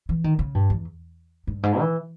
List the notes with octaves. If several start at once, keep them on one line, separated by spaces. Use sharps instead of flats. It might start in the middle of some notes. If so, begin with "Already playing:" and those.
E3
D#3
C#3
G2
E2
G2
G#2
E3